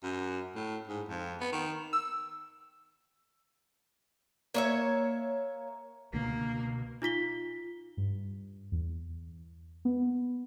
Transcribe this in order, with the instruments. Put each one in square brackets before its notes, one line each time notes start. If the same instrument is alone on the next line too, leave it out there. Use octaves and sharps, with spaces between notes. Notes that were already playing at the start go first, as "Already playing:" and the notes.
[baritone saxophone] F#2
A2
G#2
F2
B3
D#3
[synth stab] E6
[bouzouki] A#3 C#5 E5
[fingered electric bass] C#2 D3 A3 [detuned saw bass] B2 [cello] A#3
[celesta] D#4 F4 B6 G7
[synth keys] G2
E2
B3